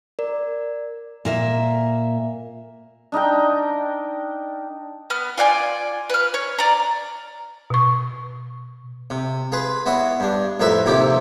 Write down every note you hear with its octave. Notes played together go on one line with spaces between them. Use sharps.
A#4 D5
A#2 A#4 E5
D4 D#4 A#4 G5
B3 F6
F4 D5 F#5 G#5
B4 F6
C#5
D5 A#5
B2 C#6
C3
F4 G#4 B4
B3 E4 F#4 C#5
G2 D4
A1 F2 A#4 B4 E5 B5
A#1 D#2 C3 E4 G4 D6